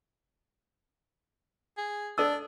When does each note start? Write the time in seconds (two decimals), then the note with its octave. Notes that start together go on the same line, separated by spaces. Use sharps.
1.77 G#4
2.18 D4 A4 D#5 E6